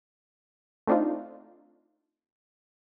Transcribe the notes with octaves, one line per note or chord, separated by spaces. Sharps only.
A3 C4 D4 D#4 F4